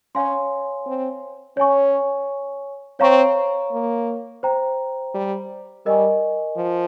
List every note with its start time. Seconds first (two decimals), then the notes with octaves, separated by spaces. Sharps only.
0.15 C#4 C#5 F5 G#5 C6
0.86 C4
1.57 C#4 C#5 G#5 C#6
3.00 C4 C#5 F5 A#5 C#6
3.72 A#3
4.43 C5 G5 A#5
5.14 G3
5.86 G3 A#4 D#5 G#5 C#6
6.56 F3